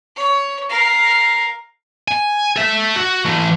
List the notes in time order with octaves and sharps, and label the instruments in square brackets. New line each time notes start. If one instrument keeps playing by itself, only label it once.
[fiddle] C#5
A#4 F5
[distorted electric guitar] G#5
A4 E5
F#4
E3 A3